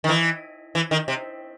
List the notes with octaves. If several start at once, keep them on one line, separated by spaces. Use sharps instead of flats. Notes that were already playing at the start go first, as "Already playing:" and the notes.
D#3
E3
E3
D#3
C3